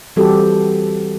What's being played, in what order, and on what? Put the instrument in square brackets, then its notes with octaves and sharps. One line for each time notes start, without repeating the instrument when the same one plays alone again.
[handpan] E3 G3 C4 F#4 G4 A4